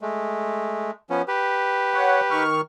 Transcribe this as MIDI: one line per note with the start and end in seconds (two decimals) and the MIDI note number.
0.01 0.91 56
0.01 0.91 57
1.10 1.22 53
1.10 1.22 59
1.10 1.22 61
1.28 2.44 67
1.28 2.44 71
1.94 2.20 73
1.94 2.20 78
2.31 2.61 51
2.31 2.61 85
2.31 2.61 89